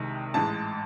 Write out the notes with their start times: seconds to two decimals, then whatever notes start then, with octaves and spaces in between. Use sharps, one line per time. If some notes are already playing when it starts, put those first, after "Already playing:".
Already playing: C2 C3 D#3 G#3
0.34 A1 G#2 E3 G#3 A5